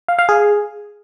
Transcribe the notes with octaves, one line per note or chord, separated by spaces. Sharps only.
F5
F5
G#4